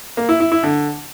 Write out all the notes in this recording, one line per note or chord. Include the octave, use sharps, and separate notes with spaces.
A#3
E4
E4
E4
D3